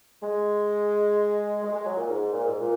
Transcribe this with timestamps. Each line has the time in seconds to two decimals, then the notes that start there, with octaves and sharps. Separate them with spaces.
0.22 G#3
1.63 G#3
1.74 G#3
1.86 F#3
1.96 A#2
2.09 G#2
2.33 A#2
2.46 G#2
2.60 A#2